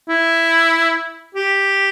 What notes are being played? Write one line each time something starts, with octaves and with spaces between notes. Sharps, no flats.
E4
G4